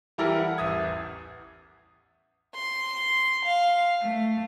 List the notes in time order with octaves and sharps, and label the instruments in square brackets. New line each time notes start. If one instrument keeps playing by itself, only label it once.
[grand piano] E3 G3 E4 G4 A4 A#4
F#5
A1 E2 E5 D#6 G#6
[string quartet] C6
F5
A3